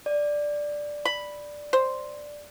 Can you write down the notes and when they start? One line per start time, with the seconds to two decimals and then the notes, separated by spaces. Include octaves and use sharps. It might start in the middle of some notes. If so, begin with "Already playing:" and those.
0.06 D5
1.05 B5
1.73 C5